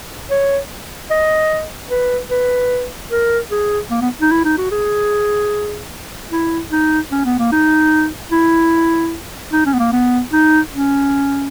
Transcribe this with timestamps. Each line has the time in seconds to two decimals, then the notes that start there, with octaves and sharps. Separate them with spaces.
0.30 C#5
1.10 D#5
1.90 B4
2.30 B4
3.11 A#4
3.51 G#4
3.91 A#3
4.01 B3
4.21 D#4
4.31 E4
4.45 D#4
4.58 F#4
4.71 G#4
6.32 E4
6.72 D#4
7.12 C#4
7.25 B3
7.39 A#3
7.52 D#4
8.32 E4
9.52 D#4
9.66 C#4
9.73 B3
9.79 A#3
9.92 B3
10.32 D#4
10.73 C#4